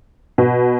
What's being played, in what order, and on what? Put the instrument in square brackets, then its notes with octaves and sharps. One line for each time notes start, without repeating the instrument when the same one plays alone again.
[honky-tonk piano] B2